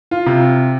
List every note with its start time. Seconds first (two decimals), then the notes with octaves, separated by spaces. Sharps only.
0.11 F4
0.26 C3